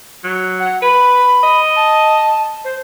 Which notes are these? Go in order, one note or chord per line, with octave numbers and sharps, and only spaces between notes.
F#3
F#5
B4 B5
D#5
A5
C5